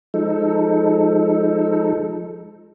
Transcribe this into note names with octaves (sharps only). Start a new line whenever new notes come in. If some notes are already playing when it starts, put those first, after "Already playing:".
F3 G#3 D#4 A4